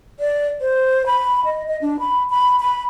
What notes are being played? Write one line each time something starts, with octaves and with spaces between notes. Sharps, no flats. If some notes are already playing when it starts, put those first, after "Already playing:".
D5
C5
B5
D#5
D#5
D4
B5
B5
B5